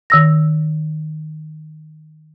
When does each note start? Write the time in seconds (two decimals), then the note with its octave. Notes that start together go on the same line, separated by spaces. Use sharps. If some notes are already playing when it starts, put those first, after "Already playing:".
0.10 D#3 E6 A#6